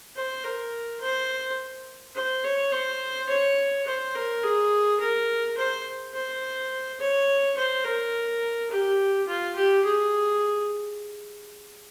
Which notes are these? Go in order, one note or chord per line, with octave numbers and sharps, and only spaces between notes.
C5
A#4
C5
C5
C#5
C5
C#5
C5
A#4
G#4
A#4
C5
C5
C#5
C5
A#4
G4
F4
G4
G#4